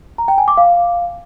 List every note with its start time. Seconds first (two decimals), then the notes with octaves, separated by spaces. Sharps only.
0.18 A#5
0.28 G5
0.38 G#5
0.48 D6
0.57 F5